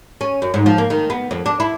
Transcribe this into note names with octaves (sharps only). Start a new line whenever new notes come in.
C#4
F#2
G#2
F3
A#3
D#3
B3
F2
D4
E4